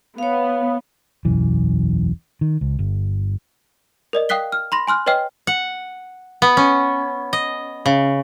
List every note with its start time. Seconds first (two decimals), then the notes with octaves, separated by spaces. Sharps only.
0.18 B3 C#5 F5
1.25 E1 B1 F#2 E3
2.41 D#3
2.61 C#2
2.79 G1
4.13 A#4 D5 D#5
4.29 F5 G5 D#6 F#6 B6 G7
4.52 F6
4.72 B5 C6 A#6
4.88 G#5 C6 F6 F#6
5.06 B4 C#5 D#5 G5 F6
5.47 F#5
6.42 B3
6.57 C#4
7.33 D#5
7.86 C#3